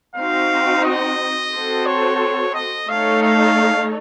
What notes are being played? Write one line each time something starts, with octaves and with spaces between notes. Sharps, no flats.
C4 D#4 F#4 F5
D#5
C4 F#4 A4 C5
C#5
D#5
A3 D#4 A4 C#5 F5
F5